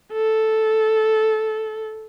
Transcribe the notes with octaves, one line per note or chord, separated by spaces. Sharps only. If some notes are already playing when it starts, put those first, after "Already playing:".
A4